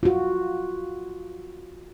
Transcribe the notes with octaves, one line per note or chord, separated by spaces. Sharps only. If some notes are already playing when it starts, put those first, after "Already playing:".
F4 F#4